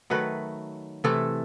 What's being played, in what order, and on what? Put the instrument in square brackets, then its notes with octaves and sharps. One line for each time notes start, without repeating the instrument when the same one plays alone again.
[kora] D#3 F#3 A3 B4
C3 E3 A3 A4